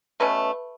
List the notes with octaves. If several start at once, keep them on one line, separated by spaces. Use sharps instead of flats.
B2 A3 C#4 B4